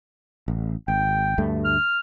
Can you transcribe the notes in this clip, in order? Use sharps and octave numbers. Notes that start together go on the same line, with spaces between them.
A1
G#1 G5
D2 G2 A3
F6